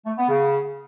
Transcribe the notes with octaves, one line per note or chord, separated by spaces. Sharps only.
A3
B3
C#3